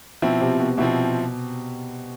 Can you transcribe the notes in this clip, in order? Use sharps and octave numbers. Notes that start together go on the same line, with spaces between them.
B2 F3 C4 E4
C3
B2
B2 F3 C4 E4